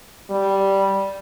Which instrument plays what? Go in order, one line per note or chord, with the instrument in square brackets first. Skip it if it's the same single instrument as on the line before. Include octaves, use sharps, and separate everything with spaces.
[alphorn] G3